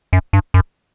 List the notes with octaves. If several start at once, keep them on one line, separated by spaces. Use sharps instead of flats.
F#2
G2
F#2